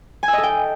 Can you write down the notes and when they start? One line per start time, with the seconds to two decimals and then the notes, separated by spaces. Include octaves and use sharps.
0.23 G#5
0.28 E5
0.33 D#5
0.38 A4
0.43 G5